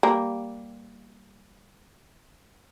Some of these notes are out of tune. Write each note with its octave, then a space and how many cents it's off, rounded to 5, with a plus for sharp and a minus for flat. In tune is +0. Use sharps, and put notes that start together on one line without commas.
G3 +0 A#3 +0